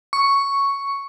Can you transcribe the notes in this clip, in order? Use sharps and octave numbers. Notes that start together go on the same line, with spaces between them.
C#6